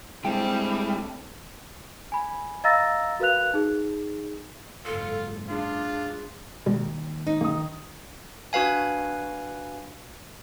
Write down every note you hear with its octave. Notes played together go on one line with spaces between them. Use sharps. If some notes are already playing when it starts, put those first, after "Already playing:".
A2 G3 G#3 C4 D4 E4 G5
G#5 B5
D#5 F5 A#5 E6 A6 A#6
F#4 A#4 B4 F5 F#6 F7
D#4 G#4
F#1 G#2 F4 A4
D4 F4 G#4
D#2 B2 G3 G#3
D#4
D#3 A#3 D#6
D4 F#4 B4 F5 G#5